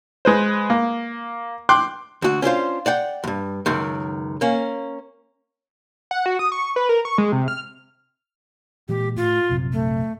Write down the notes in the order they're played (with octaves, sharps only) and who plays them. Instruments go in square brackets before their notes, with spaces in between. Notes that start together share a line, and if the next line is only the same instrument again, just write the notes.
[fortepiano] G#3 B4 C5
A#3
G5 C6 D6 F#6
[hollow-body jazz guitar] D2 F#4
C#4 D4 F4 C5
D5 F#5 G5
E2 G2
C#2 F#2 D#3
A#3 C#4
[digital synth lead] F#5
F#4
D#6
C#6
B4
A#4
C#6
G#3
C3
F6
[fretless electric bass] A#2 E3 G#3 [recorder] G4
[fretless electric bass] A2 [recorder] F4
[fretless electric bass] A#1 F#2 C3
[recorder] A3